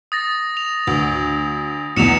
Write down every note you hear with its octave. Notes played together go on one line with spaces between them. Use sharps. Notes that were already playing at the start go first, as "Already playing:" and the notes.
D#6 A6 A#6
F7
D2
B1 E2 C#7 E7 F7